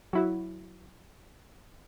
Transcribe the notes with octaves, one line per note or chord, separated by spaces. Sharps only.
F#3 E4 F#4